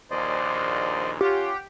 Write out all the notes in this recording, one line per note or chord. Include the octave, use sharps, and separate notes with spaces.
A#1 D#2 C5 D5 D#5
C#4 F4 G4 F#5